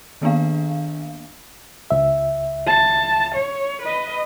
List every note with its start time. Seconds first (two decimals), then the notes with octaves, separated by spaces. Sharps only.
0.22 D#3 A#3 B3 D4 F5
1.91 C#2 E5
2.67 A5
3.35 C#5
3.82 B4 D#5